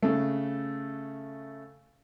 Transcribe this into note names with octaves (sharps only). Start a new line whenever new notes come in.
C#3 A3